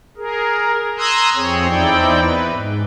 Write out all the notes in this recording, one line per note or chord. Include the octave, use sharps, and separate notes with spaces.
G#4 A#4
A#5 C6 D#6 E6 F#6 G#6
F2 C4 G#4 C#5
E2 C4 D#4 E4 D5 G5
B4
G#2